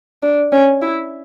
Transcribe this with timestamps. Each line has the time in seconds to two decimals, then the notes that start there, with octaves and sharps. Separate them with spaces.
0.23 D4
0.52 C#4
0.82 E4